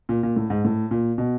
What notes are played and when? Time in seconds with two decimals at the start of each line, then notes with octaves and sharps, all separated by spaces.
0.09 A#2
0.23 A#2
0.36 A2
0.50 G#2
0.65 A2
0.91 A#2
1.18 B2